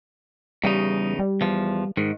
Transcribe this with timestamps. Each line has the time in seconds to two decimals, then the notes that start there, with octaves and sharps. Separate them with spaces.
0.64 E2 C#3 G3 D#4
1.19 G3
1.41 E2 F3
1.97 G#2 D#3